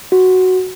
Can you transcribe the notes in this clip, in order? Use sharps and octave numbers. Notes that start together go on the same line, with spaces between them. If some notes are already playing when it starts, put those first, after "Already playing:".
F#4